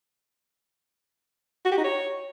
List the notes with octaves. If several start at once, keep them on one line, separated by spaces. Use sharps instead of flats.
F#4
G4
D#4
C#5